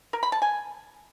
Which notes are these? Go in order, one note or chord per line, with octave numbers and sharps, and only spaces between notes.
A#4
B5
A5
G#5